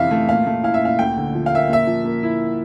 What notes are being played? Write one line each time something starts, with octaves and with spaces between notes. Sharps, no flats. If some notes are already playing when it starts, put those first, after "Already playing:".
Already playing: F2 C3 E3 E5 F5
A3
A#2 F5
A3
E4 F5
E5
A#2 F5
D2 G5
D3
F3
F5
A#3 E5
A#2 E5
F3
A#3
E4